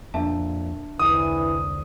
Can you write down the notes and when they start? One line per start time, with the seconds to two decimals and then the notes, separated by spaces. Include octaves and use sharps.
0.14 F2 A#2 D4 E5 A5
0.99 E1 C2 D3 E3 D#6